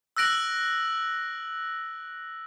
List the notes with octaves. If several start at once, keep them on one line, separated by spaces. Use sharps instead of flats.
E6 F#6 A#6 D7 F#7